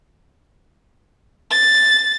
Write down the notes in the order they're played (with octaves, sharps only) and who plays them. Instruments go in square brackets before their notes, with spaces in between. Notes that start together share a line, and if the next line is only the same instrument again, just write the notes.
[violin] A6